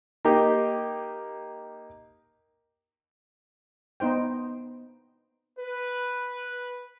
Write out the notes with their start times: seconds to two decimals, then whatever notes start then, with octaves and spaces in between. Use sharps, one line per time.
0.25 A#3 D#4 G4
4.00 B3 D#4 C5 G5
5.58 B4